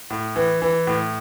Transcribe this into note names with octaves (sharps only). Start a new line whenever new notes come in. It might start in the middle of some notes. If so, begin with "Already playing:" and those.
A2
E3
E3
A2